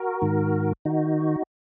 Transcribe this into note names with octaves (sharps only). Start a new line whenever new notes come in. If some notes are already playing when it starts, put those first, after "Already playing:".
Already playing: F#4 A#4
G#2 D#3
D#3 D#4 F#4